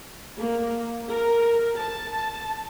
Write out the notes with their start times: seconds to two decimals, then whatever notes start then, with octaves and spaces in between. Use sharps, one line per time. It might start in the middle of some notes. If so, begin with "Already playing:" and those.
0.39 A#3
1.10 A#4
1.76 A5